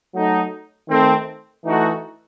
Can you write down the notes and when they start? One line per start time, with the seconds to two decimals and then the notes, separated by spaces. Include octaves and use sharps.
0.14 F#3 A3 D#4
0.88 D#3 A3 C4
1.64 E3 A3 D#4 F#4 A4